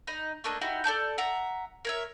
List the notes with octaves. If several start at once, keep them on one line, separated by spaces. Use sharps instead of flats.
D#4 D#5 B5
A3 A#3 D4 D#5
D#4 E4 F#4 G4
A4 D5 A5 G6
E5 F#5 A#5
A#4 C#5 E5